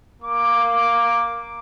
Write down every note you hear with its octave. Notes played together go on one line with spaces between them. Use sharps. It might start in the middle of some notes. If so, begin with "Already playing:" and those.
A#3 D6